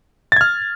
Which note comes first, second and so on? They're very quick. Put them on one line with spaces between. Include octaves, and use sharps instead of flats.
A6 G#6 F6